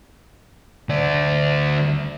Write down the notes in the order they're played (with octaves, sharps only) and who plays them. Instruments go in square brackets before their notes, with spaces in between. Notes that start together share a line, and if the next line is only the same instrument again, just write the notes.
[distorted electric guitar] D2 D5